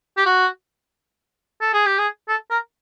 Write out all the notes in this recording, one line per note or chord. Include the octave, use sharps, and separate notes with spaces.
G4
F#4
A4
G#4
G4
G#4
A4
A#4